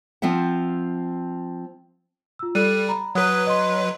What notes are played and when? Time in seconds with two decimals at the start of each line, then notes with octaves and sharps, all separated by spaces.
0.22 F3 C4 F4 E5 F#5
2.39 F4 E6
2.55 G3 A4 F#6 D#7
2.89 A#5 B5
3.15 F#3 B4 F#5 D#6 F#6
3.47 D#5 C6